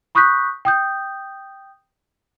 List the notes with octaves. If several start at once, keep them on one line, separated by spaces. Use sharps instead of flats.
B5 C#6 D#6 F#6 G6 B6
G5 D#6 G6